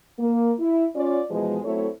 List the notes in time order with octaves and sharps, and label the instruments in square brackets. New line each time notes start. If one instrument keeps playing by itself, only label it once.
[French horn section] A#3
E4
C#4 F4 D5
B2 E3 F3 G#3
F#3 A3 C4 E4 A4 C#5